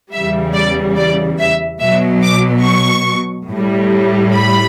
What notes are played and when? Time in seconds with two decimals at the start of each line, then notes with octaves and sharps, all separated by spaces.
0.13 E2 C#3 E3 G3 E5
0.54 D5
0.98 D5
1.39 E5
1.81 B2 F#3 E5
2.23 D6
2.64 C#6
3.49 A2 G3
4.33 B5